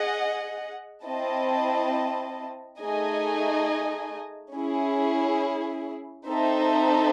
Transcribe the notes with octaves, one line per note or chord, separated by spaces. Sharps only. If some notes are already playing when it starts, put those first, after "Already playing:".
Already playing: G#4 D#5 F#5
C4 E4 C5 D#5 A5
A3 D#4 G#4 D#5 G#5
C#4 E4 G#4
C4 D#4 A4 C5 E5